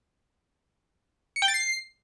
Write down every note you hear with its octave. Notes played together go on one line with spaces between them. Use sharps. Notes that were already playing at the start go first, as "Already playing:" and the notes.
C#7
G5
A6
C7